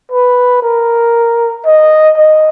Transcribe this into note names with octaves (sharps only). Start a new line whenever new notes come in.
B4
A#4
D#5
D#5